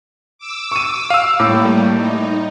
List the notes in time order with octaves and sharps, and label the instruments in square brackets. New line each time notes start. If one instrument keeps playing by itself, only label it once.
[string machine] D6 E6
[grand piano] C#6 D#7
[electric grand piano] F5 E6
[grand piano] A2 [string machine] G3 A3 A#3 [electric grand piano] D6
[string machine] D#4